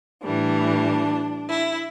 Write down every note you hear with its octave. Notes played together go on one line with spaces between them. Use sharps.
A2 E3 G3 D4
E4